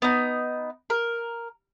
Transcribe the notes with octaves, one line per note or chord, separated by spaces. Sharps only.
B3 D#4
A#4